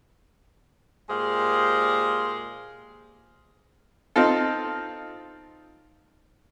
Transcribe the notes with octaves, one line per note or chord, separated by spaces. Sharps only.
A#2 G#3 G4 G#4 C5 F5
C4 D#4 F4 A4